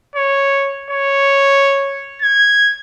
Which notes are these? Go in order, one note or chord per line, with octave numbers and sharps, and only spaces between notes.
C#5
C#5
G#6